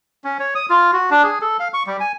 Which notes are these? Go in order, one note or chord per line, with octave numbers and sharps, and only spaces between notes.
C#4
C#5
D#6
F4
F#4
D4
G#4
A4
F5
C#6
G3
G#5